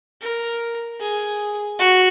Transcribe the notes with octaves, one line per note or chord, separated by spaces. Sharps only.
A#4
G#4
F#4